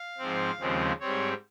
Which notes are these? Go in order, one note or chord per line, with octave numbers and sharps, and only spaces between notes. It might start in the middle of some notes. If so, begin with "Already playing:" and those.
Already playing: F5
G#2 F3 C4
D#2 C#3 F3 G#3 C4
G#2 G3 C4 C#5